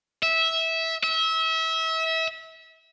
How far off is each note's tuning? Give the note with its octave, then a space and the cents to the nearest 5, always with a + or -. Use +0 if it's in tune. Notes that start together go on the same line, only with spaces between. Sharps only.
E5 -15
E5 -30